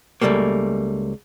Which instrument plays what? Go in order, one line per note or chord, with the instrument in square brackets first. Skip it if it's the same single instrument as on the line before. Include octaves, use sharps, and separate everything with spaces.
[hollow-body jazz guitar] C#2 G2 G3 A3 A#3